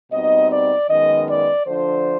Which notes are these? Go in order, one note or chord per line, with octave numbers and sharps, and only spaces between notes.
B2 G3 C4 D#4 D#5
D5
F#2 D#3 G#3 B3 D#5
D5
D3 F3 A3 D4 C5